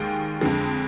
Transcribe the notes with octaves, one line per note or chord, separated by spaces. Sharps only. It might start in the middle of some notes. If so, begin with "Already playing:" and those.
Already playing: D#2 D#3 G#3 G5
F2 D3 G#3